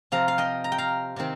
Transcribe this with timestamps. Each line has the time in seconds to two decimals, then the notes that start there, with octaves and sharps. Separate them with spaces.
0.12 C3 F3 C4 F5 A#5
0.28 F5
0.38 D#5 G5
0.64 A#5
0.72 G5
0.78 F5 A#5
1.16 C3 D#3 C4